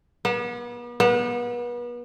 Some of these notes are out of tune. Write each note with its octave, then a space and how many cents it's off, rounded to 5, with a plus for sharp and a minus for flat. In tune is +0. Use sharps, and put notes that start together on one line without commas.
B3 -40
B3 -35